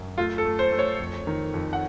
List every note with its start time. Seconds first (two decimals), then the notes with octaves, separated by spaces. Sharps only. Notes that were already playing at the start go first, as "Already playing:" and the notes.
Already playing: F#2
0.18 A3 F4
0.38 A4
0.45 A3
0.59 C5
0.72 A3
0.79 C#5
0.99 F2
1.27 D#3
1.54 F2
1.73 F#5